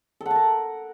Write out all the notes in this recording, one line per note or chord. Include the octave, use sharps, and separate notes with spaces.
A4
F#5
A5
A#4